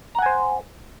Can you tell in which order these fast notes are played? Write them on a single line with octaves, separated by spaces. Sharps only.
A#5 F#5 G#5 C5